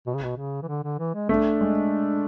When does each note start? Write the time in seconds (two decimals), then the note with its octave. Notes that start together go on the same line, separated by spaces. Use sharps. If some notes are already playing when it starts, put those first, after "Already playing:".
0.06 B2
0.14 C#3
0.23 B2
0.37 C#3
0.63 E3
0.68 D3
0.84 D3
0.99 E3
1.15 G#3
1.29 A3 D4
1.61 G#3